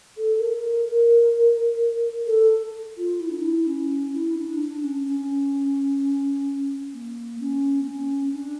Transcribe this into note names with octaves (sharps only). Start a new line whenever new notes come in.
A4
A#4
A4
F4
E4
D4
E4
C#4
E4
D4
D4
C#4
C#4
A#3
C#4
A#3
C#4
D4